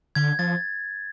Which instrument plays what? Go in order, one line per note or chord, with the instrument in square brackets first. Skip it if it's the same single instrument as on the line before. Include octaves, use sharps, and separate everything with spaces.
[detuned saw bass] D3 [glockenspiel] G#6
[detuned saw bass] F3 [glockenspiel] A6